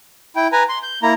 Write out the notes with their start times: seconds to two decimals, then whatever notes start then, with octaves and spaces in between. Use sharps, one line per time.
0.36 E4 G5
0.53 B4 G#5 A#5
0.69 C6
0.83 G6
1.03 A#3 E4 A#5